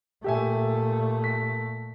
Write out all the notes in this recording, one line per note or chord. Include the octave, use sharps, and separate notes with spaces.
A#2 A3 G4 E5 G#5
B6